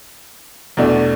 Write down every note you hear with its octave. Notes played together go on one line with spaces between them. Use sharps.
E2 B2 A3 D4